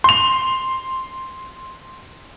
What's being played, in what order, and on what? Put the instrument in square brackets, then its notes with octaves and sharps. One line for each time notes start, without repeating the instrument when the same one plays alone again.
[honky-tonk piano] C6 F7